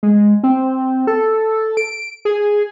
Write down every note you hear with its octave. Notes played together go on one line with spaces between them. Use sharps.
G#3
C4
A4
D7
G#4